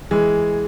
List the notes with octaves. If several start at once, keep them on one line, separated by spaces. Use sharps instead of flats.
E3 G#3